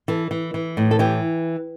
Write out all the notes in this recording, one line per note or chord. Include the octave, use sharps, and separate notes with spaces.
E3 A4
E3
E3
A2
A4
E3 G4